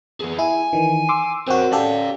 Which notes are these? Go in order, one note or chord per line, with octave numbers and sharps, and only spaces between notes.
B3 G#4
E4 G#5
D#3 E3
C6 D6 E6
C4 F#4 A#4 C#5
C#4 G4 A4 D5 F5